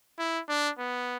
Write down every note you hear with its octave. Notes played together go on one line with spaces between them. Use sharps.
E4
D4
B3